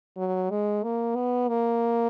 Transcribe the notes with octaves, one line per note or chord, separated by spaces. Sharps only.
F#3
G#3
A#3
B3
A#3